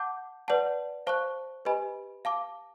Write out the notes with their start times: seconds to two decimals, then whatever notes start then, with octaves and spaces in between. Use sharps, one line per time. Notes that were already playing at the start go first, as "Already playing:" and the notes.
Already playing: F#5 A5 D6 G6
0.48 B4 D5 F#5 A5
1.07 C5 F5 A5 C#6 F#6
1.65 G4 B4 D#5 G#5 B5
2.25 F5 A5 D6